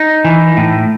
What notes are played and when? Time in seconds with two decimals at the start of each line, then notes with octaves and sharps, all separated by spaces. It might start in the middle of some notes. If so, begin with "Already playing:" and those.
Already playing: D#4
0.25 E3
0.57 A2